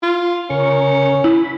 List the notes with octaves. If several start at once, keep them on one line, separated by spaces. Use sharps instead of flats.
F4
C#3 C#4 A#4 C#6
E4 B5